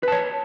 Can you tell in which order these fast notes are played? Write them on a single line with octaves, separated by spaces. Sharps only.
B4 A5 C#5